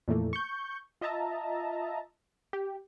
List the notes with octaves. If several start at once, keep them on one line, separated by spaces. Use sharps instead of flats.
F2 A#2 E3 A3 A#3
C#6 G6
F4 D#5 E5 A5 A#5
G4